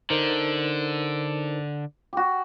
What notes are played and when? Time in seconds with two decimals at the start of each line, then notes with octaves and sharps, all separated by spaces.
0.10 D3 D#4 A#4 C5
2.13 F#4 G4